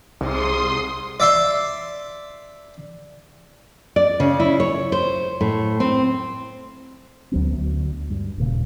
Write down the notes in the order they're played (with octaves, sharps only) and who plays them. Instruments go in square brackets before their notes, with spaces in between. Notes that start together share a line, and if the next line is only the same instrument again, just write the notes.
[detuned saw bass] C2 [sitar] G#2 C3 [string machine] C6 D#6
[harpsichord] D5 E5 C6
[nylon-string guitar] D5
C#3
E4
C#5
C5
A2
C4
[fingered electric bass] D2 F#3 B3
D2
G2
D#1 A#2 C#3